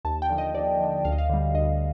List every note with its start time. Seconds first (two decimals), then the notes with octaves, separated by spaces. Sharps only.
0.05 D#2 A5
0.22 G5
0.29 D3 F3
0.38 D#5
0.55 D#2 D5
0.80 D3 F3
1.05 D2 F5
1.12 D#5
1.18 F5
1.30 D3 G3
1.54 D2 D#5